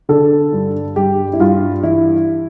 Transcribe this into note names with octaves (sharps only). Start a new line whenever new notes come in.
D3 A4
G2
G2 G4
E4
G2 F4
E3 E4